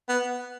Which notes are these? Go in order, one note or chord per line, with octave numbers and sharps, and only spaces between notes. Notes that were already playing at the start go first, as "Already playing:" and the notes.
B3